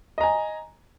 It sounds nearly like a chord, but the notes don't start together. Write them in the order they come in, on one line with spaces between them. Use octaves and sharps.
D#5 A#5 G#5